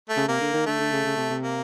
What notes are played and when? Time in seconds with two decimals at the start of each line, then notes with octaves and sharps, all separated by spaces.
0.09 A3
0.16 C#3
0.28 C3 A#3
0.41 D3
0.53 D#3
0.66 D3 A3
0.80 D3
0.92 C#3
1.05 C#3
1.17 C3
1.30 C3
1.43 A#3